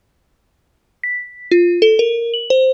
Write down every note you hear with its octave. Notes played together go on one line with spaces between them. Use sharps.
B6
F4
A4
A#4
F#7
C5